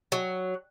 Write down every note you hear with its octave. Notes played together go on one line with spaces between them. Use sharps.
F#3